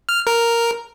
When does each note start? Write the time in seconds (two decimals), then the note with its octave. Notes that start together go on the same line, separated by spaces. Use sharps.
0.09 F6
0.27 A#4